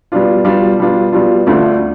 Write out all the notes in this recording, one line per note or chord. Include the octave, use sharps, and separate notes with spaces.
B2 G3 D4 F4
B2 G3 D4 F4
B2 G3 D4 F4
B2 G3 D4 F4
D2 D3 A3 D4 F4